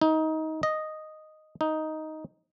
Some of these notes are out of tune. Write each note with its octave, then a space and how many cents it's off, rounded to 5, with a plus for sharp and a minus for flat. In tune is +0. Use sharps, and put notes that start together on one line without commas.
D#4 +20
D#5 -5
D#4 +5